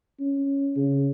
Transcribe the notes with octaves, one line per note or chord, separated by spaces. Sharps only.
C#4
C#3